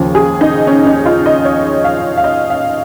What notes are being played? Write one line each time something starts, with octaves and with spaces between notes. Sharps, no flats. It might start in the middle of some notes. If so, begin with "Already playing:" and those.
Already playing: D#2 C#3 F3
G#4
D#4
C#4
D#4
F4
D#5
C#5
F5
F5
D#5
F5